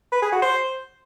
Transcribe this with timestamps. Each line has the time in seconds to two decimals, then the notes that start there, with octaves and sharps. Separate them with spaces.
0.12 B4
0.22 G#4
0.32 F#4
0.42 C5